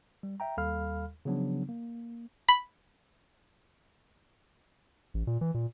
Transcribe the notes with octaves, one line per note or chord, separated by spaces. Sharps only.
G3
E5 G5 A#5
D#2 G3 A4 F5 B5 F6
C#3 F3 F#3 B3 D4
A#3
B5
A1
A#2
E3
A#2